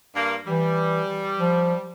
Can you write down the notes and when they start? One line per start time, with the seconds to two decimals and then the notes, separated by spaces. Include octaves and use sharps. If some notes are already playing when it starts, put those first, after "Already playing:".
0.15 G2 A#3
0.47 E3 G3
1.39 F3